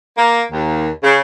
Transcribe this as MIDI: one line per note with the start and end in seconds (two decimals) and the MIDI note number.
0.17 0.40 58
0.51 0.88 39
1.03 1.19 49